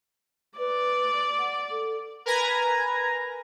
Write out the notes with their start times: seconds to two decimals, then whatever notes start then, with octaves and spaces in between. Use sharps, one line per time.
0.58 B4 D5
1.38 F#5
1.71 A4
2.26 A#4 B4 G#5 A#5